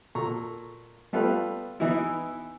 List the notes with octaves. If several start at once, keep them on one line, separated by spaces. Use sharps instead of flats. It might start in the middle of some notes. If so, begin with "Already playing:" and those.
A#2 A4 A#5 C#6
G3 A3 B3 F4 A4 B4
E3 B3 D#4 E4